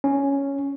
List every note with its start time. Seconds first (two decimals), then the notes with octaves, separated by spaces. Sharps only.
0.04 C#4